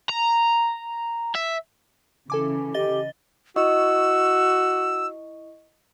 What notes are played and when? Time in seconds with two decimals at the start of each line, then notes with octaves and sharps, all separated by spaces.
0.09 A#5
1.35 E5
2.30 C#3 E3 A4 G#5 D6
2.74 G4 D#5 A6 G7
3.56 E4 F#4 D#5 C#6 E6